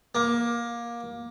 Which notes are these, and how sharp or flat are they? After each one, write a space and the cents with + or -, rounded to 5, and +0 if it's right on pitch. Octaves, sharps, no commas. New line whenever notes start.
A#3 +20